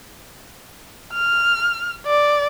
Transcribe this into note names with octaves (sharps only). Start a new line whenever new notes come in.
F6
D5